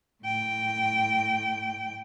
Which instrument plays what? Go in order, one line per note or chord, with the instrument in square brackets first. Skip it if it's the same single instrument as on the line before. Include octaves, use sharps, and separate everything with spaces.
[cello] A2 G5